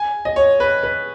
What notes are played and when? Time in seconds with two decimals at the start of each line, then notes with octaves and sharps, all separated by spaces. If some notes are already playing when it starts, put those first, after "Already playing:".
Already playing: G#5
0.25 D#5
0.36 C#5
0.60 B4
0.83 B4